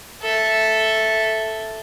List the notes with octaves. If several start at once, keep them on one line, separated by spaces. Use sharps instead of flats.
A4 E5